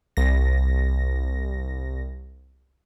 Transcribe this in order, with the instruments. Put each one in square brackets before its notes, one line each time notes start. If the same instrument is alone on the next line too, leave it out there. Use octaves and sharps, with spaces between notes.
[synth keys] C2 A#6